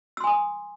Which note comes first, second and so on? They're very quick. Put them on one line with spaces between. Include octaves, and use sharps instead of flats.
E6 C6 G#5 D#6